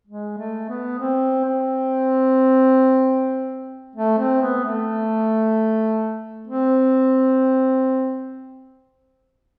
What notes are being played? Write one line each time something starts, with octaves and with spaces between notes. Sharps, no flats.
G#3
A3
B3
C4
C4
A3
C4
B3
A3
C4